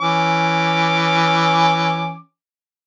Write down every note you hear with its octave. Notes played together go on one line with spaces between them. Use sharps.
E3 C#4 D6